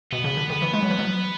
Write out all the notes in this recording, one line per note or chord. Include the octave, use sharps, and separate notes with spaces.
B2 B3
C#3
D3
D3 B3
E3
G#3
F#3
E3
F#3